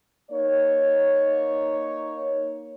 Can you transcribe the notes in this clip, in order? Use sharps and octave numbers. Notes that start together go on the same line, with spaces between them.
A#3 D#4 C#5